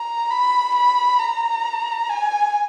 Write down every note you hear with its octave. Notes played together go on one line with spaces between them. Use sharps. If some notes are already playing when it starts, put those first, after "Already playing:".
Already playing: A#5
B5
B5
A#5
G#5